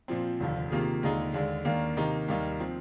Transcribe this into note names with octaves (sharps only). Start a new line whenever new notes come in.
A#2 F3 C4
F1 D#2 D3 F3
C3 D#3 A#3 F4 G#4
D#2 D3 G#3 D#4 G#4
D#2 D3 G#3 D4
D#2 D#3 A#3 D4
C3 D#3 A#3 D#4
D#2 D#3 G3 A#3 D#4
F3 C4